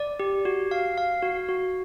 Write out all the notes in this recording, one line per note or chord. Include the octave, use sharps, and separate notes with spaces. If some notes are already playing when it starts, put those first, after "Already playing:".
Already playing: D5
G4
F#4
F5
F5
F#4
F#4